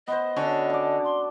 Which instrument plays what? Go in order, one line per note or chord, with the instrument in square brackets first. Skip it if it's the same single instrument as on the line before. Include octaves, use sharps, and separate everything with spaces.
[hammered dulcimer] B3 C5 [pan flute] D#5
[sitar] D3 [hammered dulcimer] C#4 F#4 A5
[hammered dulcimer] D5 A5
[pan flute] C6